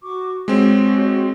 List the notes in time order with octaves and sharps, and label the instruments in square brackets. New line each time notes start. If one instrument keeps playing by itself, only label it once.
[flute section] F#4 C#6 D6
[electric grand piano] G#3 C4 [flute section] F#4 G4 C#5